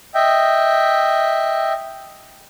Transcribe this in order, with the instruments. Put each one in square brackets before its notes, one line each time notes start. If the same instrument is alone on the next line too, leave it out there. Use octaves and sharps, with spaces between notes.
[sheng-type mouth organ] D#5 E5 G5